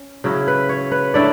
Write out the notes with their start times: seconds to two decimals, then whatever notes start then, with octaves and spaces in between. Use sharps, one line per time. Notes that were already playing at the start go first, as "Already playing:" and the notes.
Already playing: C#4
0.24 C#3 F#3 C#4 E4
0.48 B4
0.69 C#5
0.91 B4
1.14 D3 A3 C#4 E4 D5